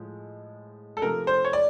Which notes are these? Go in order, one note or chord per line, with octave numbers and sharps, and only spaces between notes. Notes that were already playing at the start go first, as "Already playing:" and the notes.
Already playing: A2 F3 G#3
A4
C3 F3 A3 A#4
C5
C#5
D5